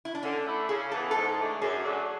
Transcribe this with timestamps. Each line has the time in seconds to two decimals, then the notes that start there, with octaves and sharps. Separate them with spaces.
0.05 E4
0.15 D4
0.23 D3 C#4
0.46 A3 E4 A4 D5
0.69 C#3 G#4
0.91 E3 B3 A4
1.11 G#2 A4
1.39 E3 A3 D4
1.61 F#2 G#4
1.84 D3 F#3 A3 D4